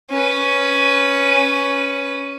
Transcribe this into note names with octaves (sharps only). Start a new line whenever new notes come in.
C#4 B4